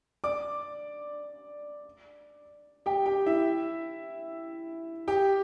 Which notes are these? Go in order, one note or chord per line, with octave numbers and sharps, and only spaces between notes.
D5 D6
G4 G5
G4 G5
E4 E5
G4 G5